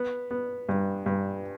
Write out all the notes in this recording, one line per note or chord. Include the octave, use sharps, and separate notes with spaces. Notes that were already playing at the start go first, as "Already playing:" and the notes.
Already playing: B3
B3
G2
G2